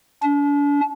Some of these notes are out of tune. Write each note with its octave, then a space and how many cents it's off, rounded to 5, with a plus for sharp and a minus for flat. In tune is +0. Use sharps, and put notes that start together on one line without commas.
D4 -40